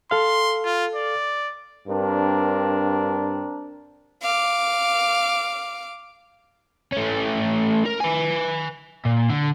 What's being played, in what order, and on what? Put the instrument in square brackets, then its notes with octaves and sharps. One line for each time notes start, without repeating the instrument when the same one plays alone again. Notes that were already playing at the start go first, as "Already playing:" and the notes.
[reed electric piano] A4 F5 [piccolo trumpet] C6
[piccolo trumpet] F4
D5
[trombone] G2 [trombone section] C4 D4 A#4
[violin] F5 D6
[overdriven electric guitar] A3 C#4
A#4
B4 G#5
A#2
D3